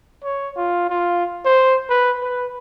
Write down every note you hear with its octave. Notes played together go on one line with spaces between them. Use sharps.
C#5
F4
F4
C5
B4
B4